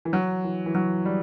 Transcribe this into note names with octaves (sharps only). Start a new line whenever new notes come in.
E3
F#3
E3
E3
F#3
G3